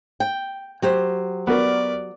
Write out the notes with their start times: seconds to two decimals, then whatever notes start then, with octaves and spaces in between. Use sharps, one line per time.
0.20 G5
0.82 F#3 G4 C5
1.47 B3 F#4 A#4 D5